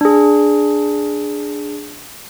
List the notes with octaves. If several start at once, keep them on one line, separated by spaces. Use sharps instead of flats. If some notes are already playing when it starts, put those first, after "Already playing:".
D4 G#4